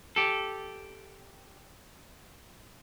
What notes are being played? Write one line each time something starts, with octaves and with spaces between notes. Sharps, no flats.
G4 A4